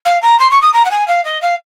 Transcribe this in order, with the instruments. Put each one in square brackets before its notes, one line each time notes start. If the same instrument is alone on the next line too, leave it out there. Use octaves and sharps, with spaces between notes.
[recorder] F5
A#5
C6
C#6
D#6
A#5
F#5
G#5
F5
D#5
F5